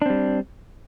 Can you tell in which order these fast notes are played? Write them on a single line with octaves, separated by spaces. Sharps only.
D4 C4 G3